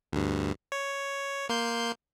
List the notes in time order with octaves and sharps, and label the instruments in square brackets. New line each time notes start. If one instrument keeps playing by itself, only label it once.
[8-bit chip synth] D2 G2
C#5
A#3 C6 G6